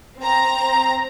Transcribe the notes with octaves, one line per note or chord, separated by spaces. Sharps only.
C4 A#5